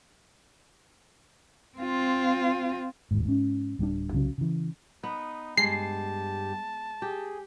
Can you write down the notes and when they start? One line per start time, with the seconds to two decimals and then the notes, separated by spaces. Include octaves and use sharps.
1.78 C4 F4
3.11 D1 D#2 G#2
3.24 G#2 C#4
3.79 D1 G3 C#4 D4
4.13 C2 C#3 F#3
4.38 C#3 E3
5.03 B3 D#4
5.57 G2 G#3 G4 A5 C7
7.02 G4 G#4